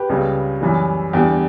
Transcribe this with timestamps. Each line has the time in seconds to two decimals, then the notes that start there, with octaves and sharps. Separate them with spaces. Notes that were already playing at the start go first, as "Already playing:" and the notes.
Already playing: G4 B4
0.09 C#2 C#3 G3
0.61 F#2 E3 G3
1.13 E2 D3 G3 G4